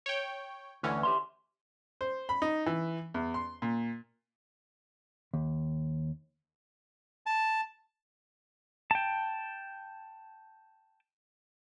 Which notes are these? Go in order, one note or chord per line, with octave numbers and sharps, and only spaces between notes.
C#5 G5
D2 D3 E3 C#4
G4 E5 C6
C5
B5
D#4
E3
E2
C6
A#2
D#2
A5
G5 A5